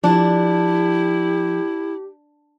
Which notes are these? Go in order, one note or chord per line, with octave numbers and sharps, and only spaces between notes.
F3 D4 E4 G4